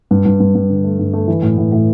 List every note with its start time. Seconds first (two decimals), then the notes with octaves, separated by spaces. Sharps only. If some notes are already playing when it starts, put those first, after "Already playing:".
0.11 G2
0.25 G2
0.40 G2
0.55 G2
0.70 D3
0.84 A3
0.99 G2
1.13 A3
1.28 E3
1.43 A2
1.58 A2
1.72 A2